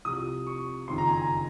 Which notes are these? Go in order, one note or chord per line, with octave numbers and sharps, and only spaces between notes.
C2 C3 F3 D#6
C#6
F#1 F2 D#3 C6
A#5
G#5
A#5